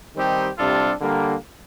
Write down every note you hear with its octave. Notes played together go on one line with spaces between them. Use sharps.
D#3 G3 C4 D#4 G4
C3 G3 D4 F4 A4
D3 G3 A#3